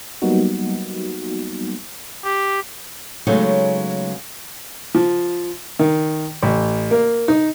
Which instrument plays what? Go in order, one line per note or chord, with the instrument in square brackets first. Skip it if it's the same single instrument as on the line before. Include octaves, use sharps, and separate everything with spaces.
[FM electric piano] F#3 G3 A#3 B3 D#4 F#4
[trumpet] G4
[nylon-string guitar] C#3 F#3 G#3 A3 B3 D#4
[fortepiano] F3
D#3
A1
A#3
D#4